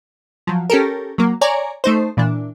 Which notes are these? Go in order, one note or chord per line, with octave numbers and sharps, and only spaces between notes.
F3 F#3
C#4 G4 A4 A#4
F#3 A#3
C#5 D5 G#5 A#5
A3 D#4 C5
A#2 E3 D4